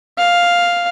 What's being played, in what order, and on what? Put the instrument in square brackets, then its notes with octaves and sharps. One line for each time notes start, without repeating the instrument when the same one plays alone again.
[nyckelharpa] F5